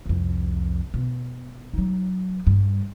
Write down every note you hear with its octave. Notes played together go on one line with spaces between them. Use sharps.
C2 F2
B2
F#3 D#4
G2 G3